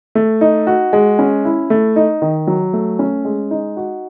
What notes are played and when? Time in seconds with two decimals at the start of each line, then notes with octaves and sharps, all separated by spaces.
0.15 A3
0.41 D#4
0.67 F#4
0.93 G#3
1.19 C#4
1.45 E4
1.70 A3
1.96 D#4
2.22 D#3
2.47 F#3
2.73 A3
2.99 C#4
3.25 G#3
3.51 D#4
3.77 F#4